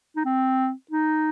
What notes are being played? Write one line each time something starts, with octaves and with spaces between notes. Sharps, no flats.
D#4
C4
D#4